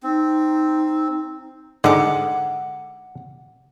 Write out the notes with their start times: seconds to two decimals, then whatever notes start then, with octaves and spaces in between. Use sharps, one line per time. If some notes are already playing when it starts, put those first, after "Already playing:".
0.03 C4 D#4
1.84 G#2 D3 G#3 F#5 D6